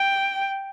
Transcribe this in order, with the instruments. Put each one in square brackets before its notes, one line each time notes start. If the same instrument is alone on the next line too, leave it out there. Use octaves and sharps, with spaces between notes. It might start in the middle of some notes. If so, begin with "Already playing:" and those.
Already playing: [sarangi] G5